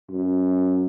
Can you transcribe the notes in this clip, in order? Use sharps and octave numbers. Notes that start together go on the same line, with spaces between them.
F#2